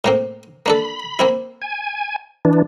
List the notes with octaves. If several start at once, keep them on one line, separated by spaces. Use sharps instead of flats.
A2 A#3 C4
A#3 D4 A4 B5
A#3 C4 E4
G#5
E3 D4